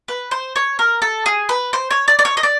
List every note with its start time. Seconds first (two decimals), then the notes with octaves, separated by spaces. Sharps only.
0.08 B4
0.31 C5
0.56 C#5
0.79 A#4
1.02 A4
1.26 G#4
1.49 B4
1.73 C5
1.91 C#5
2.08 D5
2.19 D5
2.25 C#5
2.37 D#5
2.43 D5